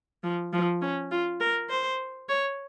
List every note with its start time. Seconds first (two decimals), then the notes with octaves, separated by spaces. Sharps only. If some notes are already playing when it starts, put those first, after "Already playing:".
0.24 F3
0.53 F3
0.82 C#4
1.11 F4
1.40 A#4
1.70 C5
2.29 C#5